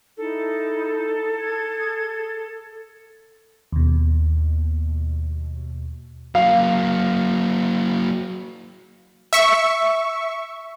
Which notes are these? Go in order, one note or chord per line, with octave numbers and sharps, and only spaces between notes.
D#4 E4 G#4 A4
G#4 G#6
D#2 B2
F#3 A#3 F5
E5 C#6